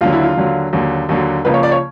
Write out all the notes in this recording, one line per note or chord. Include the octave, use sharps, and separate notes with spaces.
D#2 D3 F#3 F4
E4
F4
D#2 D3 F#3
D#2 D3 F#3
D#2 D3 F#3
C#2 C#3 F3 A#3 B4
C#5
D5
C#5